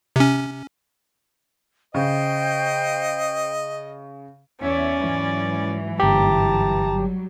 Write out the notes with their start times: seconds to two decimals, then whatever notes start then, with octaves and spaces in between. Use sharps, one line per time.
0.16 C3 C#4
1.94 C#3 C5 D#5 G5
4.61 E2 C#4 C#5 D5 E5
4.97 G#2 E3 F#3
6.00 G1 G4 A5 A#5
6.93 F#3 G3